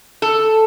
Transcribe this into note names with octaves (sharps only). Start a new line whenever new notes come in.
A4